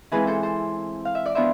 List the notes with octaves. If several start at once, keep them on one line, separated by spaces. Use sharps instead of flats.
E3 G#3 C4 F4 G#4 B4
A4 C5
A4 C5
F5
E5
D5
E3 B3 D4 F4 C5 E5